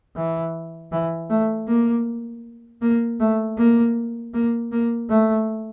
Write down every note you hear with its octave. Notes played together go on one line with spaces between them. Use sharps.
E3
E3
A3
A#3
A#3
A3
A#3
A#3
A#3
A3